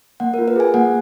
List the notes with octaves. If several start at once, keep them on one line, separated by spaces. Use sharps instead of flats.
A#3 F#5
F4 A#4
B4
G#4 G#5
A#3 F#5